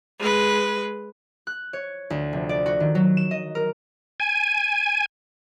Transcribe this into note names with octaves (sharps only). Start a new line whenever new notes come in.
G#3 B4
F#6
C#5
D2
F1
D5
F#4
D#3
F#3
E7
D#5
A#4
G#5